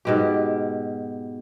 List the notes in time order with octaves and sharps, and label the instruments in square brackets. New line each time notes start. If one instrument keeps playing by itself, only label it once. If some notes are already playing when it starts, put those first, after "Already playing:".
[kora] G#2 B2 G4